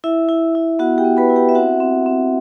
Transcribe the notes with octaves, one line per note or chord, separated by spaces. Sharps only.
E4 E5
E4
E4
B3 F#4 F#5
G4 G5
B3
B4 B5
E4
G4 G5
E5
C4 F#4 F#5
C4
C4